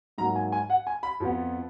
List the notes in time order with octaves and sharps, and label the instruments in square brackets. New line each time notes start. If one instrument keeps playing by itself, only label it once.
[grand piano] G#2 F#3 A#3 A#5
G#5
G#5
F#5
G#5
B5
F2 F3 B3